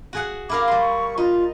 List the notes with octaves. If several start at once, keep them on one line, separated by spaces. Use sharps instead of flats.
F#4 G#4 F#5
E4 A#4 F5 D6
G3 C6
C#6
D#4 F4